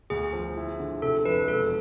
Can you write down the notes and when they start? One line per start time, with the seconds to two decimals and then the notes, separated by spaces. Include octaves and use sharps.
0.10 D2 G#4
0.33 F3
0.57 E4
0.79 D3
1.02 C3 A4
1.25 F2 B4
1.48 E1 A4